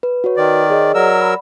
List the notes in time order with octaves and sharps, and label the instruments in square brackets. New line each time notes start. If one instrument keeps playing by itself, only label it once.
[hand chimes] B4
F#4 B4 C#5
[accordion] D#3 D5
[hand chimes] G#4 C#5 D#5
[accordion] F#3 A#4 E6 [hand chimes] D5 F#5
[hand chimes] B5